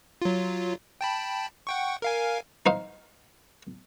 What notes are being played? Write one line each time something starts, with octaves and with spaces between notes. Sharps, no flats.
F#3 F4
G5 A5 B5
F#5 G5 C#6
A#4 F5 G#5
D#4 C5 F5